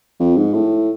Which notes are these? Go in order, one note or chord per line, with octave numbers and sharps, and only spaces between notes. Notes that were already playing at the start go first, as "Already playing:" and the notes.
F2
G#2
A2